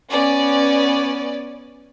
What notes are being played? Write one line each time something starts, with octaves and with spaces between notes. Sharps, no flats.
B3 C#4 D5